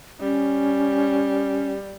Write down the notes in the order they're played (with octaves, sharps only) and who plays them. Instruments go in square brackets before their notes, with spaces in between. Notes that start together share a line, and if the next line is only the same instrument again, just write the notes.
[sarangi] G3 [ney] C#4